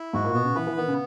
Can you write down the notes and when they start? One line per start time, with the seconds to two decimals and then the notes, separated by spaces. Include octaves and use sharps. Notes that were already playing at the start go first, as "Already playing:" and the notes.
Already playing: E4
0.13 G#2 F#4
0.24 A#2
0.34 B2 B3
0.45 C#3
0.55 E3 B4
0.67 E3
0.77 D#3 B3
0.88 C#3